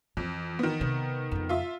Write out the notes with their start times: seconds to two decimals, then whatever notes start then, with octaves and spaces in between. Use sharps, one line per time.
0.17 F2 E3
0.59 D#3 B3
0.81 C3
1.32 F2 C#3
1.49 F4 E5